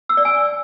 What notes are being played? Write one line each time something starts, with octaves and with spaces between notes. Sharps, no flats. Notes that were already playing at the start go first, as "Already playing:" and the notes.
E6
D5
G#5